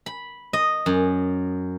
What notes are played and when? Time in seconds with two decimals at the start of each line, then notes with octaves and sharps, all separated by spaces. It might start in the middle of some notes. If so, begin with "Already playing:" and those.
0.06 B5
0.53 D#5
0.86 F#2